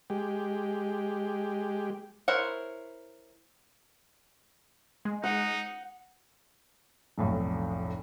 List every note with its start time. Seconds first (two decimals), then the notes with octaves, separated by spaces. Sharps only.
0.10 G#3 G4
2.28 E4 A#4 C5 C#5 F#5
5.05 G#3
5.24 D#4 F#5
7.18 F1 B1 A2